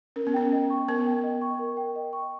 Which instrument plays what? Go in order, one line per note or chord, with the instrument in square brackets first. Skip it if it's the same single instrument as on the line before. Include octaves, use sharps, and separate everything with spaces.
[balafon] C#4 [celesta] A#4
[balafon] B3
[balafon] C#4 [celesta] G5
[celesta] D#5
C#6
[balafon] B3 [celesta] A#4
[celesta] G5
D#5
C#6
A#4
G5
D#5
C#6